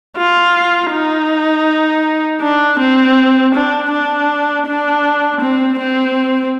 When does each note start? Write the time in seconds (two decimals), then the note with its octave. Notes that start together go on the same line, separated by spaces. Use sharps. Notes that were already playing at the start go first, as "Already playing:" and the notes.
0.17 F4
0.91 D#4
2.41 D4
2.79 C4
3.54 D4
3.92 D4
4.67 D4
5.41 C4
5.78 C4